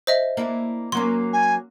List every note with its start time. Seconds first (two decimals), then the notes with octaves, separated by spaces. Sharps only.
0.07 C5 D#5 E5
0.37 A#3 D4 E4
0.92 F#3 A#3 C#4 C6
1.33 G#5